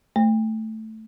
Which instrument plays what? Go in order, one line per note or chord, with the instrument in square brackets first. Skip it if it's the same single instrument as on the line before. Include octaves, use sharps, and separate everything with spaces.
[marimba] A3